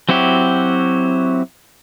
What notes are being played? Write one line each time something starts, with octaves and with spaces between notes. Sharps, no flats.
F#3 C4 E4 F#4 G4